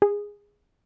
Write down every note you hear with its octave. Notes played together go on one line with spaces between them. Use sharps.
G#4